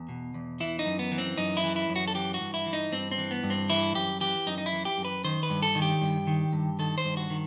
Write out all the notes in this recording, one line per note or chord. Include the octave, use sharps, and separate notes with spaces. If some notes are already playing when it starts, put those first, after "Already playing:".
Already playing: E2
B2
E2
E3 E4
D#4
F#2
B3
E3
C4
F#2 D#4
E4
E3
E4
F#2
F#4
A4
E3 G4
F#4
G2
E4
E3
D#4
G2 C4
C4
E3
B3
G2
C4
E3 E4
F#2 G4
E3 G4
F#2 D#4
D#4
E4
E3
G4
F#2
B4
D#3 C5
B4
G2
A4
D#3
G4
G2
D#3
G2
D#3 A4
C5
G2
F#4
D#3